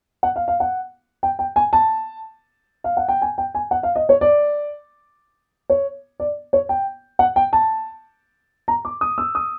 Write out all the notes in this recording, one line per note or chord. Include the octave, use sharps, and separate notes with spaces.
F#5
F5
F5
F#5
G5
G5
G#5
A5
F5
F#5
G5
G#5
G5
G#5
F#5
F5
D#5
C#5
D5
C#5
D5
C#5
G5
F#5
G5
A5
A#5
D6
D#6
E6
D#6